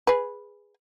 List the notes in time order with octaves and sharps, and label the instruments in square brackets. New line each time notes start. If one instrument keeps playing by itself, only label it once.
[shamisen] G#4 B4